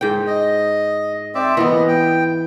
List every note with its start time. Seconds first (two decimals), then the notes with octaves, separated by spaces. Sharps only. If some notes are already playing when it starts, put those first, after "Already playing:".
0.01 G#2 G5
0.27 D#5
1.35 C4 D5 E5
1.57 E3 B3 D#5
1.88 G5